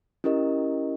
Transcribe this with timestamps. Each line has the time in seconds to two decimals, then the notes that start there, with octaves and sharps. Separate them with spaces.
0.24 C#4 E4 G4 A#4 D#5